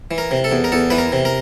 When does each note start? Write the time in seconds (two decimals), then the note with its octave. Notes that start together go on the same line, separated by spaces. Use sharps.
0.11 E3
0.18 A#4
0.31 C3
0.44 A4
0.51 E2
0.64 A#4
0.72 E2 A4
0.90 E3 B4
0.98 A#4
1.12 C3
1.25 A#4